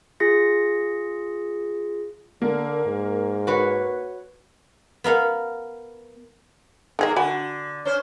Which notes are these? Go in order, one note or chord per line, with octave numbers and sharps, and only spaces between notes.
F4 G#4 A#6 C#7
D3 A#3
G#2
F#4 B4 C#5
B3 A#4 F5 F#5
G#2 C3 D#3 A#3 G#4 D#5
D3 F#4 G#5 B5
C#4 C5